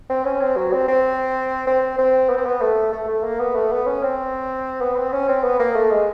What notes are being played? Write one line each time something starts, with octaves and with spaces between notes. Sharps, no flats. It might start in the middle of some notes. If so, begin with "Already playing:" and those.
C4
C#4
C4
F#3
C4
C4
C4
C4
B3
C4
B3
A3
A3
A3
A#3
B3
A3
B3
C#4
C4
B3
C4
C#4
C4
B3
A#3
A3
G#3